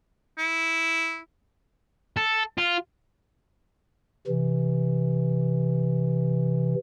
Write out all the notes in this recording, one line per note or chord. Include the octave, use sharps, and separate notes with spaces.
E4
A4
F4
C3 E3